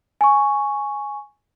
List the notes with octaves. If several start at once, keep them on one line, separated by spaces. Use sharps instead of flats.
G#5 C#6